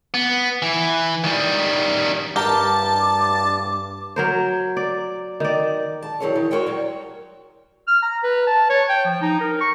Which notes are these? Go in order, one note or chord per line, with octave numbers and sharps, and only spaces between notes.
B3
E3
D#3 G3
G2 G4 A#4 A5 D6
F#3 A#4 C5
D5
D#3 D5
A5
D#3 E3 F#3 G#4 C#5
D#3
F#4 A#4 C5 C#5 G5
F#3 G3
F6
A#5
B4
A5
C#5
G5
F3
D#4
A#4
C#6